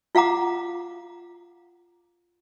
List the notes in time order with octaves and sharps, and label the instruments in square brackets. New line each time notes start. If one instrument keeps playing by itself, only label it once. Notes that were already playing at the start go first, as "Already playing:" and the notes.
[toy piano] F4 F5 F#5 A#5 D6